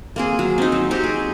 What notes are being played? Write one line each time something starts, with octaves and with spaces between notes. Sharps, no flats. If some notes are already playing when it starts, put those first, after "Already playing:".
A#3 C4 G#4
F#3
C4 D#4
F#3
C4 F#4 G4
G#4